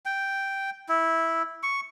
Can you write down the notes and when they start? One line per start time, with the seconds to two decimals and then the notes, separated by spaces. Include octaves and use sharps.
0.06 G5
0.89 E4
1.63 C#6